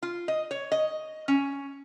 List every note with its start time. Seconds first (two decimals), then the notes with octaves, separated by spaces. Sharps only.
0.03 F4
0.28 D#5
0.51 C#5
0.72 D#5
1.28 C#4